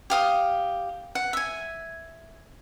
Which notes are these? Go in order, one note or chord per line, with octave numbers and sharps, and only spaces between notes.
G4 F5 D#6
F#5
E5 G#5